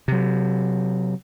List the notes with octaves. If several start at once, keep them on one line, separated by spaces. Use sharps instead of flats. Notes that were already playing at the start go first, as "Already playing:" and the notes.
C3 F#3